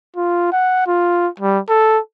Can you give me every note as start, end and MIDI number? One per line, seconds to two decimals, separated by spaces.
0.16 0.52 65
0.53 0.85 78
0.87 1.28 65
1.40 1.59 55
1.69 1.99 69